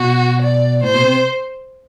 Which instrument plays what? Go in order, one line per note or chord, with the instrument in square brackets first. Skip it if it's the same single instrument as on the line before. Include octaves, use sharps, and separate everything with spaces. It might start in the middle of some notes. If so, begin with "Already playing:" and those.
Already playing: [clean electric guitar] B2 [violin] F#4
[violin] D5
[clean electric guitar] A2 [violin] C5
[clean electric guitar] B2
C3